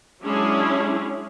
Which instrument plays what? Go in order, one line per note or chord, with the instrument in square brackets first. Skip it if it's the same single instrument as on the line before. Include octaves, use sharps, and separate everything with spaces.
[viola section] F#3 G#3 C#4 D4 E4 G#4